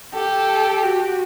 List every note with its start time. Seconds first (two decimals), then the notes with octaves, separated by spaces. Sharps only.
0.14 G4 A4
0.83 F#4